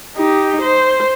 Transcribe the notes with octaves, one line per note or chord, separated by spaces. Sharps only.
D#4 G4
C5